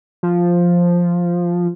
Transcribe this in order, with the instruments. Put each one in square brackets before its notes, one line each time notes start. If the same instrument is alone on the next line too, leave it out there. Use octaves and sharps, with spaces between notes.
[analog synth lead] F3